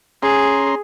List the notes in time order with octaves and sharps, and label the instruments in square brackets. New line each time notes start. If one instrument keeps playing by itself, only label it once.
[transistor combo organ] C#4 A#5 C6 [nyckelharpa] G#4